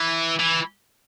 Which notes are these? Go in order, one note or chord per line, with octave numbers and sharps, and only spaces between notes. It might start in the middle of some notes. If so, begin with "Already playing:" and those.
Already playing: E3
E3